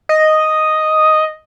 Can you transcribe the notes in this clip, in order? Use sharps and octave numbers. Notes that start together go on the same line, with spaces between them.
D#5